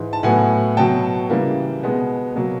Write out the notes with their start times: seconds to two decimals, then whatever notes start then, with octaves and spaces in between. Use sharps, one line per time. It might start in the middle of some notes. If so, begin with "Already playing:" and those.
Already playing: G#2 E3
0.13 A5
0.23 A2 F#3 B3 F#5 G#5
0.77 B2 F#3 B3 G5 A5
1.30 C#3 E3 G3 A#3
1.83 B2 G#3 B3
2.36 B2 F#3 A#3